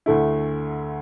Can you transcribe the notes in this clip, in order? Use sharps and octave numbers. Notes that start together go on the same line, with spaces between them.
D2 D3 A3 E4